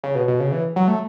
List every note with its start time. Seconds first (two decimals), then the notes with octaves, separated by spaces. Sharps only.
0.04 C#3
0.15 B2
0.28 B2
0.40 C#3
0.52 E3
0.76 F#3
0.88 A3